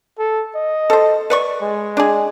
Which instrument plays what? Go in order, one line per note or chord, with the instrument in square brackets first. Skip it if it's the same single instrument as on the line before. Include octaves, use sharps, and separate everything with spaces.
[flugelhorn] A4
D#5
[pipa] A4 C5
B4 D5 C#6
[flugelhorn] G#3
[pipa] D4 G#4